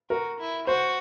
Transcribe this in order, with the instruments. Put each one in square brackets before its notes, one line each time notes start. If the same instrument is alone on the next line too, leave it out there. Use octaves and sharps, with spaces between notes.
[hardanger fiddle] F#4 [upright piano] A#4
[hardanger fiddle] E4
[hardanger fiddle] F#4 [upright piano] C5